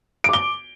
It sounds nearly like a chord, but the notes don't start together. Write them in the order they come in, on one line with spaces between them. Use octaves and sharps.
D7 D6 G7